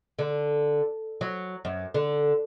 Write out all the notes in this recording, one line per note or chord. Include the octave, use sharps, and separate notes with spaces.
D3
F#3
F#2
D3